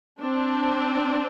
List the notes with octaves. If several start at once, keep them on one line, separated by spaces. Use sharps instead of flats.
C4 D4